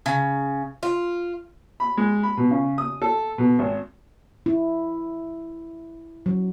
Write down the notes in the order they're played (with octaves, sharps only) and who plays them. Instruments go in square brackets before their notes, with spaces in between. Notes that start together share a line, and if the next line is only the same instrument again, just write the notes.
[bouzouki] C#3
F4
[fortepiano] B5
G#3
B5
B2
C#3
D#6
A4
B2
G#1
[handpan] E4
F#3